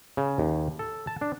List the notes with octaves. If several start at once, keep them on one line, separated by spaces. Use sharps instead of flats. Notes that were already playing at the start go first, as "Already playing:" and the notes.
C#3
D#2
A4
A5
D4